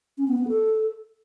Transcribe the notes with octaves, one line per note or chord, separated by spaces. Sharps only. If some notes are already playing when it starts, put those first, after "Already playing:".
C#4
B3
B3
A4